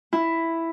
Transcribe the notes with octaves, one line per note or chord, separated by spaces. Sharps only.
E4